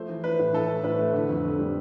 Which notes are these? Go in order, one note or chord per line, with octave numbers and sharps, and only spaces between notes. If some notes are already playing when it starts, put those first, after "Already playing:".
Already playing: F3 A3 C5
E3
E3 B4
A2
E3 A4
A3
A2 B4
A3
D3
F2
D3
G3